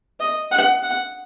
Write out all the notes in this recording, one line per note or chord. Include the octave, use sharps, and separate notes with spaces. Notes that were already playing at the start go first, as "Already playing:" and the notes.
D#5
F#5
F#5